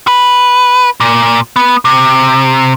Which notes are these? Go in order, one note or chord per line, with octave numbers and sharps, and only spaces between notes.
B4
A#2
B3
C3